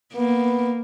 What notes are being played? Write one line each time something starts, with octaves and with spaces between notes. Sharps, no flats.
A#3 B3